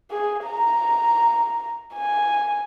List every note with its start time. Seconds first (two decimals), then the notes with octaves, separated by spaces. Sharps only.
0.11 G#4
0.46 A#5
1.95 G#5